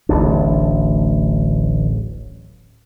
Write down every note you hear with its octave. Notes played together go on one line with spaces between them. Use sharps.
D1 A1 D4